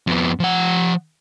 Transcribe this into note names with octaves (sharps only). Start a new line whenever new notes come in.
F2 B3
F3 F#5